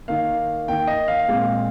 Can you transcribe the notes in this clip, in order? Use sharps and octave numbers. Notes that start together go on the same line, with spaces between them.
D#3 A#3 F5
D#3 A#3 G5
D#5
F5
A#2 G#3 C4